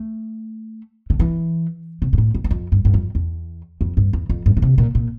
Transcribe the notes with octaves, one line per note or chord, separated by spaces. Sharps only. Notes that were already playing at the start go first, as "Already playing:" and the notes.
Already playing: A3
D3
E3
C3
G2
A2
F2
E2
F2
G2
G2
F2
E2
F2
G2
E2
F2
G2
D3
C3
A#2
A#2